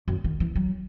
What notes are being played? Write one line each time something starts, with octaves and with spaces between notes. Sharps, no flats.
F#2
D#3
E3
F#3